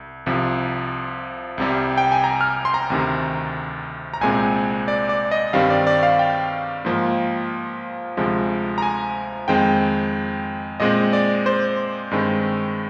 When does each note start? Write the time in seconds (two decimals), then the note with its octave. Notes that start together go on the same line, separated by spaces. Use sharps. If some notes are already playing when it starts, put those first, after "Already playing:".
Already playing: C2
0.26 C2 C3 F3
1.58 C2 C3 G3
1.98 G5
2.12 G#5
2.24 A#5
2.41 F6
2.65 C6
2.74 A#5
2.90 D2 C3 D#3
4.14 A#5
4.21 C2 A#2 G#3 C4 G#5
4.88 D5
5.09 D5
5.31 D#5
5.53 G2 D#3 G3 C4 F5
5.70 D5
5.87 D5
6.03 F5
6.19 G5
6.85 G#2 F3 A#3
8.17 D2 C3 F3 G#3
8.78 A#5
8.82 G#5
9.48 F2 D#3 G#3 C4 G5
10.80 A#2 G#3 C4 D#5
11.13 D5
11.46 C5
12.11 G2 D#3 G#3 C4